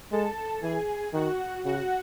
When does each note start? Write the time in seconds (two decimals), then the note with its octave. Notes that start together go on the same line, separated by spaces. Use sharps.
0.11 G#3 A4 A5
0.62 E3 G#4 G#5
1.13 D#3 F#4 F#5
1.64 C#3 F#4 F#5